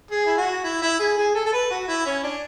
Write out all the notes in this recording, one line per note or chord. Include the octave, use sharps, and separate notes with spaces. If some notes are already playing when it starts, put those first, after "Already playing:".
G#4
E4
F#4
E4
E4
G#4
G#4
A4
A4
B4
F#4
E4
C#4
D4